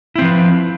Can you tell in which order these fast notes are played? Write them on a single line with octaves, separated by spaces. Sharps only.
E4 C4 F3 B4